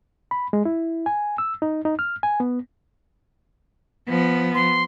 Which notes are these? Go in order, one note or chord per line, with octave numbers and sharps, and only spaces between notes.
B5
G#3
E4
G#5
E6
D#4
D#4
F6
G#5
B3
F3 B3
C6